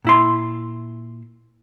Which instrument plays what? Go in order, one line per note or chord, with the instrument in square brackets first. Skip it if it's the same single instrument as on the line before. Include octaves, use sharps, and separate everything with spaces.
[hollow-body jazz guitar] A#2 E4 C6